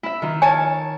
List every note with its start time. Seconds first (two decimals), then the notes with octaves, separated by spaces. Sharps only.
0.03 E4 E5
0.22 D#3 F4
0.42 C#5 G#5 A5